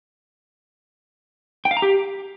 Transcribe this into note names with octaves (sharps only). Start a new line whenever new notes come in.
G5
F5
A#5
G4